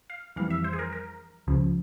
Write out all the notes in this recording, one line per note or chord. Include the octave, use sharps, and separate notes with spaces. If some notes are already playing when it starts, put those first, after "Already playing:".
F5
F2 E3 G3 F5
E5
C5
G#4
A#4
A#4
C#2 C#3 F3